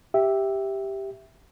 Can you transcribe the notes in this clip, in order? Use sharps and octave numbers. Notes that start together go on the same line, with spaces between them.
G4 E5